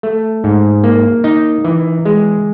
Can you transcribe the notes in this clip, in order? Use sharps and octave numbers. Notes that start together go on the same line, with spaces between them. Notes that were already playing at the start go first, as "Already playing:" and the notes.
A3
G#2
A#3
D#4
E3
G#3